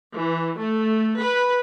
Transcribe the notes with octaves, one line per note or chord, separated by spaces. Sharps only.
E3
A3
B4